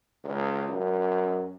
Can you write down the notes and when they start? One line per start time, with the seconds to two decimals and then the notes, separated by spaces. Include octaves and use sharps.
0.24 C#2
0.69 F#2